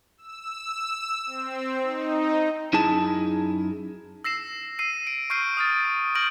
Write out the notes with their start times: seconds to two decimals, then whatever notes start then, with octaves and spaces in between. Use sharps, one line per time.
0.18 E6
1.26 C4
1.82 D#4
2.73 F#2 D#4 E4 G#4 A5
4.24 E6 A#6 C7 E7
4.79 E6 C7 D#7
5.07 D7
5.30 C#6 F6 G6 C7 D7 D#7
5.57 D#6 F6 A6
6.15 C#6 F6 G6 A#6 D7 F#7